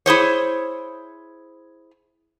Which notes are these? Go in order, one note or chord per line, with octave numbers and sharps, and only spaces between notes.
E4 G#4 C5 C#5